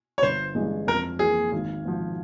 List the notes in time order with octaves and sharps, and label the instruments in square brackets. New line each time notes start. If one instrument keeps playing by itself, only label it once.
[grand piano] C#5
[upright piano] G1 [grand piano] C5
[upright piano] G2 E3 G#3 C#4
[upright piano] F2 [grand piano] A#4
[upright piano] E3 A#3 [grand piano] G#4
[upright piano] G#1
G#2 F3